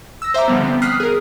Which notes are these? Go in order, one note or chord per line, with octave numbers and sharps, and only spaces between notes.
E6 A#6
C5 E5 A#5 D6
D3 F3 G3 B3
B3 C4
D#6 F6 F#6 B6 C7
G#4 A#4